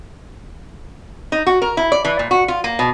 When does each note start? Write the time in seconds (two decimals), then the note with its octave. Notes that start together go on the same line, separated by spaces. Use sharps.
1.32 D#4
1.47 F#4
1.62 A#4
1.77 E4
1.92 D5
2.05 E3
2.19 A#2
2.31 F#4
2.48 F4
2.64 A#3
2.79 B2